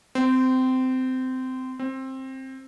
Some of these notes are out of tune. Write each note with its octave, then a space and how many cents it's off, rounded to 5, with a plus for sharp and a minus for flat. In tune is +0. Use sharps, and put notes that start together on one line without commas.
C4 -20
C4 +15